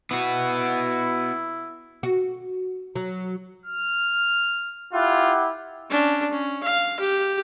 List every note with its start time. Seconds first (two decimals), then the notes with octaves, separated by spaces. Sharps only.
0.11 B3 E4 F#4
2.03 F#4
2.96 F#3
3.66 F6
4.93 E4 F4 G4 F#5
5.90 C#4 D4
6.31 C#4
6.63 F5
7.00 G4